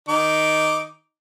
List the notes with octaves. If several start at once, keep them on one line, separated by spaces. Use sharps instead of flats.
D#3 D#4 D6